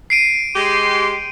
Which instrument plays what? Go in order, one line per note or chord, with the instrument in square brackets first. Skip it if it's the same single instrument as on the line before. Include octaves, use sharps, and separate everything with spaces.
[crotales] C7 D7 D#7
[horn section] G#3 G4 C6